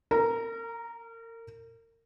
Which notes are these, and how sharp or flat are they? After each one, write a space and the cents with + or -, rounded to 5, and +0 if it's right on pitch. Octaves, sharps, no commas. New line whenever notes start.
A#4 -35 A#5 +0